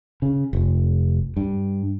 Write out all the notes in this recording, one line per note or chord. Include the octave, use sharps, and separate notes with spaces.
C#3
F1
G2